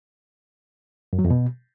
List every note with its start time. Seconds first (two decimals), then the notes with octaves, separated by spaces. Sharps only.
1.13 F#2
1.19 F#3
1.25 F2
1.31 B2